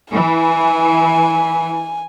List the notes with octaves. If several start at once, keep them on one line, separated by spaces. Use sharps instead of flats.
E3 G#5